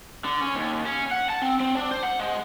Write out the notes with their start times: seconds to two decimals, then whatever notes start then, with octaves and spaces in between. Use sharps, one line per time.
0.24 D3
0.41 C#4
0.55 D#2
0.85 C#4
1.11 F#5
1.29 A5
1.42 C4
1.60 C4
1.76 D4
1.91 C5
2.03 F#5
2.19 G#3